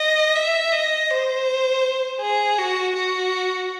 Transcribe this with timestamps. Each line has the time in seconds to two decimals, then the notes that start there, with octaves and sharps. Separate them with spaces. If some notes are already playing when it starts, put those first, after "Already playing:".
Already playing: D#5
0.36 E5
0.72 D#5
1.10 C5
2.21 G#4
2.58 F#4
2.96 F#4